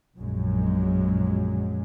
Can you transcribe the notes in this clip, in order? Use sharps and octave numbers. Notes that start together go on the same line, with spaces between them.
A#1 F#2 F#3 G#3